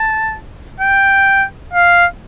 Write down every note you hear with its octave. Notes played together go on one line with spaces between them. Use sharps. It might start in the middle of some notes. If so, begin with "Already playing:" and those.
Already playing: A5
G5
F5